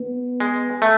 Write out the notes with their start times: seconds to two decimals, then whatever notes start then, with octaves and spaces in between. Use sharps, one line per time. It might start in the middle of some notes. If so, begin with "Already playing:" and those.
Already playing: B3
0.40 G#3
0.82 A3